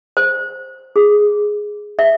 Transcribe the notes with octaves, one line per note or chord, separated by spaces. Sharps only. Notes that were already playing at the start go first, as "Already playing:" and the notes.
C5
G#4
E5